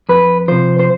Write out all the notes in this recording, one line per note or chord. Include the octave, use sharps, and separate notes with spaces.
F2 B4
C3 F3 C5
C5